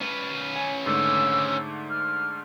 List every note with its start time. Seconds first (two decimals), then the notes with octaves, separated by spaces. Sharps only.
0.01 C#4 B4
0.56 G#5
0.86 G#2 D3 A3 E6
1.90 F6